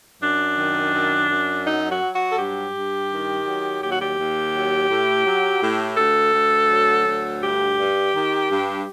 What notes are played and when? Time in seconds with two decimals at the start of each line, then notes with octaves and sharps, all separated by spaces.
0.21 F#2 D4
0.58 D#3
0.94 F#2
1.30 F#2
1.66 F#3 D#4
1.90 F#4
2.02 F#3
2.14 F#4
2.30 A4
2.37 G2 G4
2.73 G2
3.10 D#3
3.46 F#3
3.82 D#2 G4
3.90 F#4
3.99 G4
4.18 D#2
4.54 F#3
4.90 A2
5.25 F#3
5.62 A2
5.97 D2 A4
6.33 D2
6.70 F#3
7.06 D2
7.41 G2 G4
7.78 G2
8.14 D#3
8.50 G2